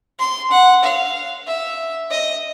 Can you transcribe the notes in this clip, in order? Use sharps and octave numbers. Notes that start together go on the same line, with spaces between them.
C6
F#5
F5
E5
D#5